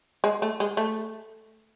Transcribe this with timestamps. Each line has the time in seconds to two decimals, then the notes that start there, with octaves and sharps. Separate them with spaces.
0.24 G#3
0.42 A3
0.60 G#3
0.77 A3